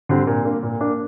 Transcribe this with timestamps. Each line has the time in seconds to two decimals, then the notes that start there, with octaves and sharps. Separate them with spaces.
0.09 D3 G3 C4
0.27 A#2
0.45 A#3 D4
0.63 A#2
0.81 A#3 D4